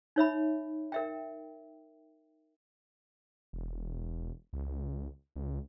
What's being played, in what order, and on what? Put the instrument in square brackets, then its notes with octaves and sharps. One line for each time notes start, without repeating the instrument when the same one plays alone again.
[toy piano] D#4 C#5 E5 B5
A#4 E5 G5
[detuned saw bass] E1
C#2
C#2